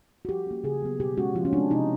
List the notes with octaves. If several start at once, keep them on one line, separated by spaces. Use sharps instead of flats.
F#4
F3 G4
A#3 C#4
C#3 G#4
F#3 B3
B2 G4
G#3 C#4 F#4
F3 F4
C#4
G#3 C4 D4
C3 D#4